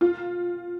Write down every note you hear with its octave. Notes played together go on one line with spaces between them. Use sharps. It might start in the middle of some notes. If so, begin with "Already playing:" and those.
F4